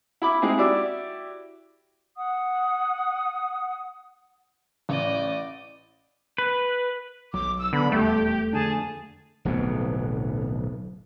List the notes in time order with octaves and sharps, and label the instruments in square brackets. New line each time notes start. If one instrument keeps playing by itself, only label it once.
[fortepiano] E4 B5 D6
G#3 C4 D#4 E4 G#4
E4 F#4 G4 D5 D6 E6
[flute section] F#5 D#6
[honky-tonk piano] A1 [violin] D5 D#5
[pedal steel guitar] B4
[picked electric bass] B1 F#3 [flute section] D6
[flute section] E6
[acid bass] D3 [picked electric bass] B3 [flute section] B5
[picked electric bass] D#1 E2 G3 [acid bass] A3 [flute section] G4
[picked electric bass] F2 D3 D4 [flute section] G#4 A5
[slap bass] D1 B1 F2 B2